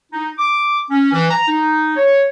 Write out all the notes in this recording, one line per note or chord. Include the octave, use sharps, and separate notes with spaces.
D#4
D6
C#4
E3
A#5
D#4
C#5